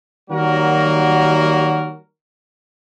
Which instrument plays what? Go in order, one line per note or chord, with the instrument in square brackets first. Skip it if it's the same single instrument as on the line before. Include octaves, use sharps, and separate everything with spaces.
[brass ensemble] D#3 F#3 G3 A#3 F#4 A#4